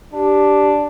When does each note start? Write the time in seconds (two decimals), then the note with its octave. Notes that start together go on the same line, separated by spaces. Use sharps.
0.13 D4 G4